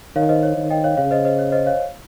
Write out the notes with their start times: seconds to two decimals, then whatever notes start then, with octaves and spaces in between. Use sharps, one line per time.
0.16 D#3 C#5 F5
0.29 C5 D#5
0.43 C#5
0.57 D#3
0.70 D#5 G5
0.84 C#5 F5
0.97 C#3 C#5 F5
1.11 C5 D#5
1.25 C5 D#5
1.39 C#5
1.52 C5 D#5
1.66 C#5 F5